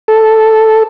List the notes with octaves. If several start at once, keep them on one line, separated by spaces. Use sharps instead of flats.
A4